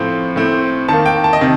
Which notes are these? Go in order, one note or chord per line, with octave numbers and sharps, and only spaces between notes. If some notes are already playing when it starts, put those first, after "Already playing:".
Already playing: A2 F3 C4
A2 A3 C4
D#3 A#3 A5
G5
A5
D#5
C3 D#3